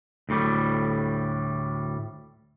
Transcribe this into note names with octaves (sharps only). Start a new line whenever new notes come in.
D2 A2 G3